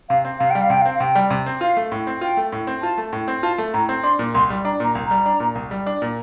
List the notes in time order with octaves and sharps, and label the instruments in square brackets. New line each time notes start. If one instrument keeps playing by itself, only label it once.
[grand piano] C3 [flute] F5
[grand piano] C4
[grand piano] C3 [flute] F5
[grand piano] G3 [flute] G5
[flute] F5
[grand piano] C3 [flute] G5
[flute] F5
[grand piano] C4
[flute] F5
[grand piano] C3 [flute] G5
[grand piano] G3
C3
C4
[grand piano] F4 [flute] F5
[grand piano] A3
A2
C4
[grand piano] F4 [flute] G5
[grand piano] A3
A2
C4
[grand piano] F4 [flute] A5
[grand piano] A3
A2
C4
[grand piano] F4 [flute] A5
[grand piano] A3
[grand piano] A2 [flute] A#5
[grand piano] C4
[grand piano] D4 [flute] C6
[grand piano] A#2
[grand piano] C2 [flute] C6
[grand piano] G3
[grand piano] D4 [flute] A#5
[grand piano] A#2 [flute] A#5
[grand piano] C2
[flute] A#5
[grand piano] G3
D4
A#2
C2
G3
D4
A#2